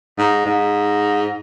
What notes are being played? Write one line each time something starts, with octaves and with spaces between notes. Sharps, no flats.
G#2
G#2